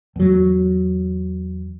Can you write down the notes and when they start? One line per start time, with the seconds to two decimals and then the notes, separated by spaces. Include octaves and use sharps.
0.16 E2 F#3